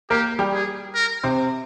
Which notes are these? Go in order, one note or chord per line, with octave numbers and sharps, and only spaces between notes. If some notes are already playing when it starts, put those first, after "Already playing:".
A#3 G4 A#4
G3 G4
G#4
A#4
C3 C4